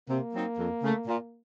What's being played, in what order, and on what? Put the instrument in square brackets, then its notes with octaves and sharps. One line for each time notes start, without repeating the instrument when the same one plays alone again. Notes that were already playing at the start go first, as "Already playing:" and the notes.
[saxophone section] C3 [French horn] A#3
[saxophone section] F#3 C4 D#4
F2
C#3 A3
A#2